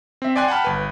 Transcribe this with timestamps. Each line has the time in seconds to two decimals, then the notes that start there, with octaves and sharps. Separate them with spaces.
0.22 C4 E5
0.36 D5 G5 G#5 C6 F#6
0.48 F#5 G5 A5 B5 F6
0.64 G1 B4